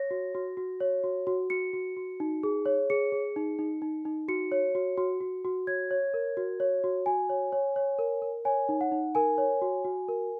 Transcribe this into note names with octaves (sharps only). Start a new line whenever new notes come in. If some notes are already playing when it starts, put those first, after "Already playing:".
Already playing: C#5 A#6
F#4
F#4
F#4
C#5
F#4
F#4
F#4 C#7
F#4
F#4
D#4
G#4
C#5
G#4 C#7
G#4
D#4
D#4
D#4
D#4
F#4 C#7
C#5
F#4
F#4
F#4
F#4
C#5 G#6
C#5
A#4
F#4
C#5
F#4
F#4 G#5
C#5
C#5
C#5
A#4
A#4
C#5 G#5
D#4
F#5
D#4
A#4 G#5
C#5
F#4
F#4
A#4